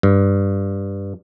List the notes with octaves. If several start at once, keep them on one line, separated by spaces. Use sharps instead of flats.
G2